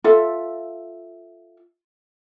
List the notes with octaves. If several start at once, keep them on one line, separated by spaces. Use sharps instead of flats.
F4 A4 E5